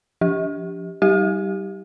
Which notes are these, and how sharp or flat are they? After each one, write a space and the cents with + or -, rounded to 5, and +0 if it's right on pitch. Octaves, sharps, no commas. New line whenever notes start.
F3 +0 G4 +0
G3 -25 G4 +0